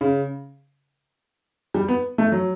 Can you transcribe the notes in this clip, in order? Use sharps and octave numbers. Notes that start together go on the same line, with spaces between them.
C#3
G3
B3
A3
F#3